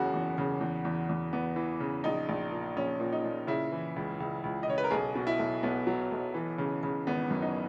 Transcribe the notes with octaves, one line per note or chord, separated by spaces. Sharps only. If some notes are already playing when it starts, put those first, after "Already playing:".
Already playing: F#1 E2 C#3 E3 F#4
E2
C#3
E2
E2
E2
E2 B3
E3
C#3
A#1 D#4
A#1
A#2
A#1 C#4
A#2
D#4
A#2
C#3 E4
E3
C#2
C#2
C#2
D#5
C#3 C#5
B4
A#4
B1 G#4
B2
E4
B1
B1 B3
F#3
B1
E3
C#3
C#3
G#1 B3
F#2
D#4